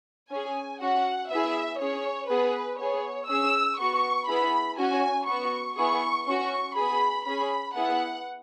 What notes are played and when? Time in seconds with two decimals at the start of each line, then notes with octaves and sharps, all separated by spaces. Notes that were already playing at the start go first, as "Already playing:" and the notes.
0.31 C#4 G#4 G#5
0.81 C#4 F#4 F#5
1.31 B3 E4 G#4 E5
1.80 C#4 G#4 C#5
2.30 B3 G#4 B4
2.79 B3 G#4 C#5
3.29 C#4 G#4 E6
3.79 B3 F#4 C#6
4.28 B3 E4 G#4 B5
4.78 C#4 F#4 G#5
5.27 B3 F#4 C#6
5.77 B3 E4 G#4 C#6
6.27 C#4 F#4 C#6
6.76 B3 G#4 B5
7.26 C#4 G#4 B5
7.75 B3 E4 G#4 F#5